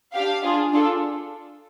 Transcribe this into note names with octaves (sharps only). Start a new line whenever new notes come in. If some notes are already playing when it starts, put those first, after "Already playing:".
D4 G4 F5
D4 F4 G#4
D4 F4 A4